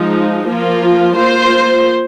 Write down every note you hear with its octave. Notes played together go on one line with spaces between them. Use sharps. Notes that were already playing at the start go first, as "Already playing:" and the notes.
Already playing: F3 G#3 D#4
F3 A#3 F4
A#3 F4 C5